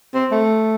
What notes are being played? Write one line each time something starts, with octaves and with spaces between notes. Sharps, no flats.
C4
A3